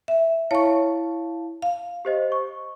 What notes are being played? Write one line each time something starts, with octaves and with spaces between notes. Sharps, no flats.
E5
E4 C#5 F5 A5 C#6
F5
G4 C5 D#5
C#6